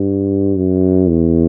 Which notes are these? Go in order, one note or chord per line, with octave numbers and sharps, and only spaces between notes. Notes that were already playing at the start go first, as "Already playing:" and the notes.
Already playing: G2
F#2
E2